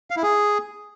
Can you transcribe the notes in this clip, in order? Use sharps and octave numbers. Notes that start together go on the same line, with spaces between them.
F5
E4
G#4